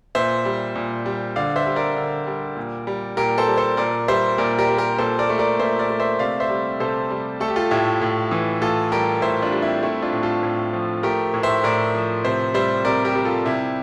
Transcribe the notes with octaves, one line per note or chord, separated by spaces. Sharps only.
A#2 C5 E5
G3
A#2
G3
D3 D5 F5
C5 E5
G3
A#4 D5
D3
G3
A#2
G3
A#2 G4 A#4
A4 C5
G3
A4 C5
A#2 A#4 D5
G3 C5 E5
A#2 A#4 D5
G4 A#4
G3
G4 A#4
A#2 A4 C5
A#4 D5
A3
A#4 D5
A#2 C5 E5
A#4 D5
A3
C5 E5
C3 D5 F5
C5 E5
G3
C3 A4 C5
G3
A3 A4
G4
F4 A4
A2 E4 G4
A2
E3
A2 F4 A4
G3 G4 A#4
A2 C5 E5
D4 F4
G3
C4 E4
A3 C4 E4
D4 F4
A2
F4 A4
A2
F3
A3 G4 A#4
A2
C5 E5
A2 A#4 D5
F3
C3 C5 E5
G3 C5 E5
C3 A#4 D5
G4 A#4
G3
F4 A4
C3 E4 G4